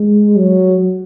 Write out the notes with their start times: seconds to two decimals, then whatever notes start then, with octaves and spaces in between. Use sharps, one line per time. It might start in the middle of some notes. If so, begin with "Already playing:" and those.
Already playing: G#3
0.37 F#3